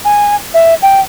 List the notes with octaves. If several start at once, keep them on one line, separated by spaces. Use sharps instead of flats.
G#5
E5
G5